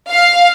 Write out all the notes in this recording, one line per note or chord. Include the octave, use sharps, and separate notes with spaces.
F5